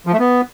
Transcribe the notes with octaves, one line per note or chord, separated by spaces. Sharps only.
F3
A3
B3